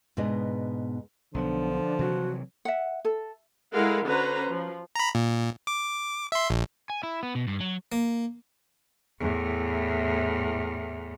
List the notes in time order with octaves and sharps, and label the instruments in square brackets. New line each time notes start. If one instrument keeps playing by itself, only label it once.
[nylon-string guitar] G#2 B2 B3 D4 G#4 D#5
[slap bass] B1 D#3 B3 [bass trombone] D3 [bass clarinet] F3
[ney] D4
[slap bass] C3 E3 F#3 [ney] F#4
[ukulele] E5 F#5
A4
[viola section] G#3 E4 A4 A#4 F5 F#5
D3 C#4 F#4 B4 C5 A#5
F3
[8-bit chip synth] A#5 B5
A#2
D6
E5 C6
A#1
[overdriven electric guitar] G#5
E4
B3
B2
G2
F#3
[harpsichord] A#3
[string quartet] E2 A2